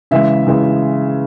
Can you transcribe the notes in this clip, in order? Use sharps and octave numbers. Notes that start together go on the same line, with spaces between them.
C#3 E3 G#3 E5
C#3 E3 G#3